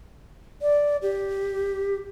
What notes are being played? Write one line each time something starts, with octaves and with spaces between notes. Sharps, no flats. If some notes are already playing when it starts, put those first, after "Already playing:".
D5
G4